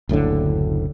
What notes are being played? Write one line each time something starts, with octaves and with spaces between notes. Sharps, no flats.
F#1 D2 A2 D3